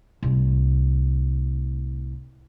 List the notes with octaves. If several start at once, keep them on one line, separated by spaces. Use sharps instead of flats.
C2 A2